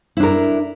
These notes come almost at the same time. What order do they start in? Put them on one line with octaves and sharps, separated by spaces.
E4 D4 A#4